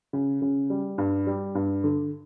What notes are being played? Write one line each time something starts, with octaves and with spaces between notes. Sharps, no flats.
C#3
C#3
G3
G2
G3
G2
D3